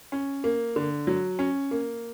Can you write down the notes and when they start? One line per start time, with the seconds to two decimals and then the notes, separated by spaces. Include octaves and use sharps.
0.12 C#4
0.44 A#3
0.76 D3
1.07 F#3
1.39 C#4
1.71 A#3